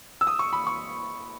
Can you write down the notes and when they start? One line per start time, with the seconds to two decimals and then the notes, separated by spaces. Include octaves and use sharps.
0.21 E6
0.27 D#6
0.39 C#6
0.53 B5
0.67 C#6